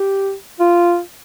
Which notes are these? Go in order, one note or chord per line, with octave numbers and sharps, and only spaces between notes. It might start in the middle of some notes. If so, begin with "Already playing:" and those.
Already playing: G4
F4